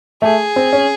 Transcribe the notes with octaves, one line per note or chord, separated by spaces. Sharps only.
A3 G#4
C4
C#4